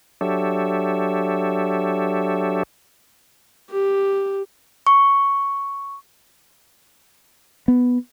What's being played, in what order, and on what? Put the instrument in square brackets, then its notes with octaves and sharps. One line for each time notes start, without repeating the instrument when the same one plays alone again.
[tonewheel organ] F#3 D4 G4 A4 C#5 E5
[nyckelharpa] G4
[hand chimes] C#6
[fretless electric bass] B3